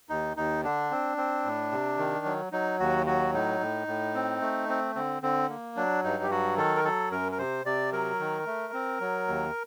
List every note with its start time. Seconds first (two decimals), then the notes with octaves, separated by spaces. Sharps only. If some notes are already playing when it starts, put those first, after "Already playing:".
0.09 D#2 D#4
0.37 D#2 D#4
0.64 D3 D4
0.91 C4
1.17 C4
1.45 A2
1.72 C3
1.98 D#3
2.26 F#3
2.52 F#3 D#4
2.79 D#2 F#4
3.06 F#3 F#4
3.34 A2 D#4
3.61 A2
3.87 A2
4.14 C4
4.42 A3
4.69 C4
4.95 D3 C4
5.23 D3 C4
5.49 A#3
5.76 F#3 D4
6.04 G2 D#4
6.23 G4
6.30 F#3 F#4
6.57 D#3 A4
6.77 A#4
6.84 F#3 A4
7.11 F#2 A#4
7.32 A#4
7.38 C3 C5
7.65 C3 D5
7.92 F#3 A#4
8.19 D#3
8.46 A3
8.73 C4
9.00 F#3
9.27 D#2